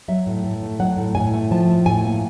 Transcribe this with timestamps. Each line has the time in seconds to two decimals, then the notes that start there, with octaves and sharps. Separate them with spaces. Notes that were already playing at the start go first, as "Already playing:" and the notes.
0.08 F#3 E5
0.26 A2
0.44 A2
0.62 A3
0.79 F#3 F#5
0.97 A2
1.15 A2 G#5
1.34 A3
1.51 F3 A5
1.69 A2
1.86 A2 G#5
2.04 A#3